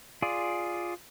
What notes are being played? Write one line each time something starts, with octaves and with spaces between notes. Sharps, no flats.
F4 G#4 D5